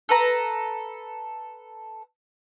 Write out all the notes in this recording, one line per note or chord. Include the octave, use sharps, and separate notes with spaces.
A4 B4 A#5